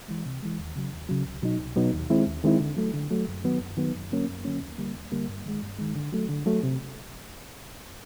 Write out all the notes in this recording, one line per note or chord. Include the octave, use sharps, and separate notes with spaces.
E3 G#3
C3
E3 G#3
D#2
C#3 F#3
D#2
C#3 F#3
C2
B2 F#3 B3 D#4
C2
B2 F#3 B3 D#4
D#2
D#3 G#3 C4 E4
D#2
D#3 G#3 C4 E4
D3
F#3 A3
D3
F#3 A3
F#2
D#3 F#3 B3
F#2
D#3 F#3 B3
F#2
D3 F#3 A#3 C#4
F#2
D3 F#3 A#3 C#4
D#2
D3 G3 A#3
D#2
D3 G3 A#3
G2
D#3 G#3
G2
D#3 G#3
D3
F#3 A3
D3
F#3 A3
C3